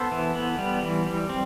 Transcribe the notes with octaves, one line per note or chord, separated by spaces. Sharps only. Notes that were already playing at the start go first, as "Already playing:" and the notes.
Already playing: B3 A4 C5
E3
B3
G3
E3
G3
C4